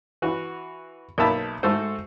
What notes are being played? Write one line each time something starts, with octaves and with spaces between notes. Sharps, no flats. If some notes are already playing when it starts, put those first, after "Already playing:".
E3 F#4
B1 A#3 D#4 E5 A5 B5
G#2 A3 F#4 A4 C5